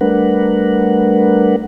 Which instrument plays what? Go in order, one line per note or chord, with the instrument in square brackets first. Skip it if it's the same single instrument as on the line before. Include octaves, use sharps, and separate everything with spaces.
[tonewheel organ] G3 A3 D4 A#4 B4 F#5